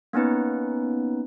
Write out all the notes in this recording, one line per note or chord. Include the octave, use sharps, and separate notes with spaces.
A#3 B3 C#4 D#4 B4